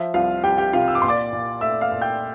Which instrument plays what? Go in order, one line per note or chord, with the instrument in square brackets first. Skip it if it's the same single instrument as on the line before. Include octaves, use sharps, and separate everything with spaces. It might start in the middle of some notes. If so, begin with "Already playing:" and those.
Already playing: [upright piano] F3 E5
C2 F4 F5
C2 G4 G5
G4 G5
C3 F4 F5
E6
D6
A#2 C6
D5 D6
A#2
A3 E5 E6
F5 F6
A#2
G5 G6